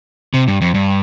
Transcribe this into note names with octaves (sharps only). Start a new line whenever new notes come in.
C3
G2
F2
G2